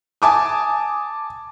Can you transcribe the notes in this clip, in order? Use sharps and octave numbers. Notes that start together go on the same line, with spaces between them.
G#5 A5 D6 D#6